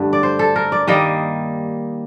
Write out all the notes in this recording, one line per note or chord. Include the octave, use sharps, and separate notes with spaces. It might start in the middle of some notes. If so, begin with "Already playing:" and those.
Already playing: G2 D3 A3
D5
C5
A4
A#4
D5
D#3 G3 A#3 D#5